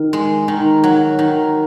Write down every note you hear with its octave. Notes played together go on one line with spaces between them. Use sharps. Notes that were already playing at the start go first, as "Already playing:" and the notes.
Already playing: D#3
G#3
D#3
F#3
D#3